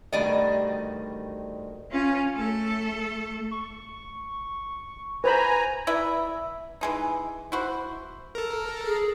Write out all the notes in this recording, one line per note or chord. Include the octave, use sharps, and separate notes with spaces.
D2 G2 B2 D#3 D5 D#5
C#4 F4
A3 A4
C#6
B4 C5 G#5 A#5 B5
E4 B4 D5 E5
E3 G#3 D#4
E4 F#4 C5
A4 A#4
G#4